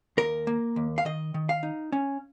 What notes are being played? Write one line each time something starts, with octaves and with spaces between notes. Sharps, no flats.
D#2 A#4
A#3
D#2
F5
D#3 D#5
D#3
F5
D#4
C#4